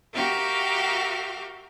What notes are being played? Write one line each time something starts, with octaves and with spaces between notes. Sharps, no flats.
F#4 G4 A#4 E5 F5 G5